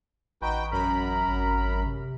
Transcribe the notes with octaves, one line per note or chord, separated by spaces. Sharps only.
A1 D#4 F#4 B4 G5
F#2 A#4 A#5 B5
G#1
C3